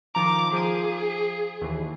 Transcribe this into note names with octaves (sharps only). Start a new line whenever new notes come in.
D#3 F3 A#5 D6
F3 G#4 D#7
D#2 E3